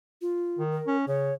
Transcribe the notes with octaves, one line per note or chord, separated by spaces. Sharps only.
F4
D#3
A#4
C#4
C#3 C#5